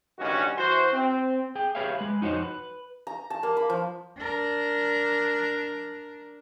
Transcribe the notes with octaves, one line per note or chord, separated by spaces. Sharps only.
A1 G2 D#3 G3 C#4 F#4
E3 F#4 C5
C4
G#4 G5
G4 G#4 B4 C#5 E5 F5
G#3 B4
F2 D#4 F#4 C5 C#5
B4
A#5
A5
A#3
B5
F3
D4 A#4